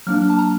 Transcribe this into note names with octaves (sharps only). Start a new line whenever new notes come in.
F#3 A#3 D4 F6
A5
A#5